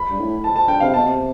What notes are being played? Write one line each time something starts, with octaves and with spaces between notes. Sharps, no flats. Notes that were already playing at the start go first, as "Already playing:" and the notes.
Already playing: B5
G2
A2
A5
A5
D3 G5
C3 F5
B2 A5
C3